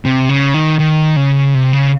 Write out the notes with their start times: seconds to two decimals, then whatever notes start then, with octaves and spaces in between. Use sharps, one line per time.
0.05 C3
0.29 C#3
0.54 D#3
0.79 D#3
1.16 C#3
1.54 C3
1.73 C#3